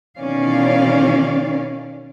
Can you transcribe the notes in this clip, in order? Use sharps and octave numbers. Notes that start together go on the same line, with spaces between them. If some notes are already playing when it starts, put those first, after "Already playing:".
B2 D#3 E3 C#4 D5 F5